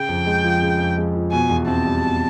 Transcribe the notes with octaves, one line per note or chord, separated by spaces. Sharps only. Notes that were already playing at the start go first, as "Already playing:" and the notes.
Already playing: C#3 G5
F2
G#3
F3
C#3
F2
G#3
F3
B2 G#5
E2
C4 A5
G3
B2